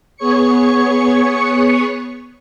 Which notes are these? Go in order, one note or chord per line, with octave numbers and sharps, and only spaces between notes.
B3 G#4 C#5 C#6 C#7